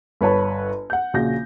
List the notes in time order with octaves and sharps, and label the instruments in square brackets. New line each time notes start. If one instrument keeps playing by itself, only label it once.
[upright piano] G1 B4 C#5 A5 B5
F#5 G6
A#1 C#3 F#4 G6 A#6